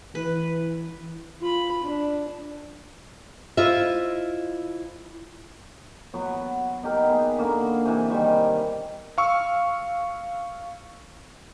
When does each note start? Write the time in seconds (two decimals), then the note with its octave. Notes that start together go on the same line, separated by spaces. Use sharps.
0.15 E3 B4
1.41 F4 B5
1.83 D4
3.57 E4 F4 C5 D#5 E5
6.13 F#3 B3
6.83 B3 D#4 G4 A#4
7.09 B3 G#4
7.38 D3 A#3 F#4
7.85 C3 E3
8.10 D#3 G3 G#5
9.18 F5 C#6 E6